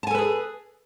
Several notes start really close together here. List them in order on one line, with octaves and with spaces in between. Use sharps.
A5 G#5 A4 B4 G#4